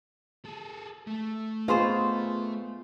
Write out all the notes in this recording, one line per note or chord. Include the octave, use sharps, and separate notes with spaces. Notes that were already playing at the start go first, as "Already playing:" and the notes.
G#4 A4
A3
B3 F4 G#4 B4 C5 D#5 C6 C#6